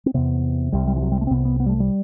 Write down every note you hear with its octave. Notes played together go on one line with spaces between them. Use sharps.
C4
E2 C3 B3
C2 C3 G3
G3
E3
F#3
G3
A3
C4
C2 C3 B3
B3
B3
G3
A3
G3